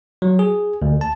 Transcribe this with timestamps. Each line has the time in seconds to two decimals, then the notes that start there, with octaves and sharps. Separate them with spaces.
0.22 F#3
0.39 G#4
0.82 D2
1.01 A5